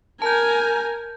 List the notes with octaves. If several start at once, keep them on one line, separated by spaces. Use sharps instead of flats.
A#4 G#5 A5 G6